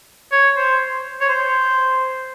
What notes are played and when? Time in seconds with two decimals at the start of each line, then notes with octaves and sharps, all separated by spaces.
0.32 C#5
0.56 C5
1.21 C#5
1.29 C5